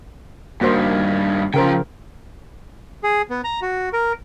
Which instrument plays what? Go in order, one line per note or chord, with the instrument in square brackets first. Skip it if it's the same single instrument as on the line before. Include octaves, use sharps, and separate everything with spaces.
[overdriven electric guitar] G2 D#3 [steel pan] A#3 F#4 C5
[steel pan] C#3 A#4 C5 [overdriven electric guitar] F3 G5
[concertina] G#4
B3
A#5
F#4
A#4